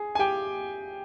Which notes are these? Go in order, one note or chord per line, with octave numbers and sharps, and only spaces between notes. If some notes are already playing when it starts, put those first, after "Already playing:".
Already playing: G#4
G#5
G4 G5